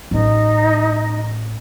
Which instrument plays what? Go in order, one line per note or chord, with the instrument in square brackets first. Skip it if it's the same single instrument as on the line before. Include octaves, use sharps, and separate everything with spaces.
[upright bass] A1 [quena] D#4